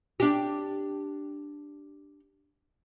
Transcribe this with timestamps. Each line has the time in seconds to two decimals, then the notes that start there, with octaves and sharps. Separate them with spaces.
0.20 D4 G4